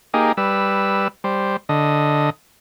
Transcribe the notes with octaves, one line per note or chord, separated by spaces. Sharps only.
A#3 D#4 G4 G#4
G3 B4 E6
G3 C5
D3 D#5